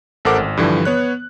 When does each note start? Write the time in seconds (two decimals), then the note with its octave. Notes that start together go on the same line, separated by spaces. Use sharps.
0.25 A1 A4 A#4 C5 F#5 D6
0.38 G#1
0.57 G2 D3 E3 F3
0.85 B3 C#5 F#6